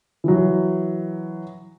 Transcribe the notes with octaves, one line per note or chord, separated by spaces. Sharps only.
E3 F#3